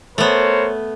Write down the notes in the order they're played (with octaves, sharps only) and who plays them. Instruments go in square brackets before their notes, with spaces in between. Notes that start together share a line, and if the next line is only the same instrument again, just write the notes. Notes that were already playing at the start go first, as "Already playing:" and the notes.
[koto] A3 B3 [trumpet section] A#4 C5 C#5